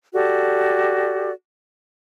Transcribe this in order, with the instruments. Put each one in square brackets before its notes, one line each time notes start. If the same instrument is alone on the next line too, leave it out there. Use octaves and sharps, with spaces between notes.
[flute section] F#4 G4 A4 D5